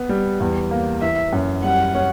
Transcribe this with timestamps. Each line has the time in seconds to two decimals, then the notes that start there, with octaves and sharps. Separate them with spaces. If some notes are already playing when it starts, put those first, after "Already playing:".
Already playing: B3
0.09 G3
0.40 E2
0.71 A#3
1.01 E3 E5
1.33 F#2
1.63 G3 F#5
1.94 C#4